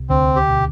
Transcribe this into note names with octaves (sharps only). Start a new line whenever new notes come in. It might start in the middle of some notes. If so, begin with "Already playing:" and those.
Already playing: C2 C3
D2 D3 C4
G4
B2